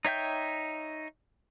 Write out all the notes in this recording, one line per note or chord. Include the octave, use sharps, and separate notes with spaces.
D#4 C#5 E5 G5 G6